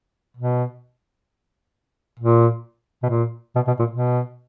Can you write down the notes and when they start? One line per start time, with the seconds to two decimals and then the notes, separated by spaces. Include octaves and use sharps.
0.37 B2
2.19 A#2
3.03 B2
3.10 A#2
3.55 B2
3.67 B2
3.79 A#2
3.91 B2